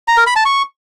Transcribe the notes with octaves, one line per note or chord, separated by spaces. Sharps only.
A#5
A#4
B5
A5
C#6